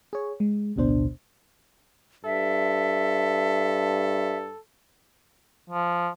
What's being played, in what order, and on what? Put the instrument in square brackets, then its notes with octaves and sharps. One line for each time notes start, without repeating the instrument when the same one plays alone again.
[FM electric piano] G#4 C#5
G#3
A1 D2 B2 D4 C5
[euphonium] G2 [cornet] A4 [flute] E5
[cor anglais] F3